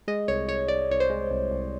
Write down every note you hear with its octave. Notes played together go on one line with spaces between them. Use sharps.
G#3 D#5
C2 C#5
C2 C#5
C2 D5
C2 C#5
C5
G#3
C2
C2